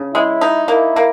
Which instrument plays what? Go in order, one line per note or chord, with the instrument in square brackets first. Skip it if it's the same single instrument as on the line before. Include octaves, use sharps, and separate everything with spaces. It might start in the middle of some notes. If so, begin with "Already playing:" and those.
Already playing: [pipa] C#3
[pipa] G#3 [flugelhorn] E4
[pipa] D#4
[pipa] A#3 [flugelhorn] E4
[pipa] A#3